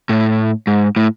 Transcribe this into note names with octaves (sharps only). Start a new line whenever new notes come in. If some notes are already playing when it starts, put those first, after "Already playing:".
A2
G#2
A2